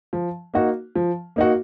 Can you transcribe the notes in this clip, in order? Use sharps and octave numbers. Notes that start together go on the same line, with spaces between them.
F3
A#3 D#4 F#4
F3
A#3 D#4 F#4